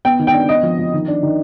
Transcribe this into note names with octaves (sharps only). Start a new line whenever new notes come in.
B3 G5
D#3
G5
D4
B3 D#5
F3
F3
D#3
D4
D#3